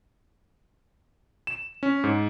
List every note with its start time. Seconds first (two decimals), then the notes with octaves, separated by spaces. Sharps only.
1.47 E7
1.83 C#4
2.04 G#2